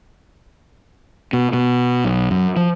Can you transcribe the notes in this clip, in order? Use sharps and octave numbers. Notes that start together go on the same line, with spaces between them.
B2
B2
B1
F#2
F3